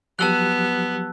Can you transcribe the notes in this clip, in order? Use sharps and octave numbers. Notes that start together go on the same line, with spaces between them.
F3 F#3 B3 G4 A5 E6 F#6